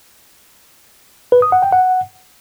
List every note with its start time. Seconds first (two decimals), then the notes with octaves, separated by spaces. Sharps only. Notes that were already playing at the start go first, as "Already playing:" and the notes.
1.32 B4
1.42 D#6
1.52 F#5
1.62 G5
1.72 F#5